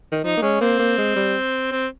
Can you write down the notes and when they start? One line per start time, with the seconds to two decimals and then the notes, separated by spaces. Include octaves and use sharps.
0.12 D#3
0.24 F3 D#4
0.37 A#3
0.42 G#3 C#4
0.61 A#3 C4
0.79 A#3
0.98 G#3
1.16 G3
1.71 C4